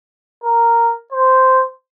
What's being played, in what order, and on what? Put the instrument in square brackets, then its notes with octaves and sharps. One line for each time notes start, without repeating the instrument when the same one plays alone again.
[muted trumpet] A#4
C5